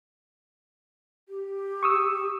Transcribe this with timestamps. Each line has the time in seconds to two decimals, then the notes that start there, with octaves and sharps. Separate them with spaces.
1.29 G4
1.83 C#6 D#6 E6